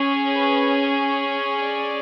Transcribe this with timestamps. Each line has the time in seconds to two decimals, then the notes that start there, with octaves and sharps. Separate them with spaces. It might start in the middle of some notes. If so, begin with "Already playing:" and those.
Already playing: C#4 G#4
0.34 B4
1.62 D5